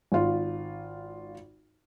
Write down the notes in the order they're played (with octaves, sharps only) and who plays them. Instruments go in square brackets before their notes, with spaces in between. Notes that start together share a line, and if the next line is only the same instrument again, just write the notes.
[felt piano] G#1 F4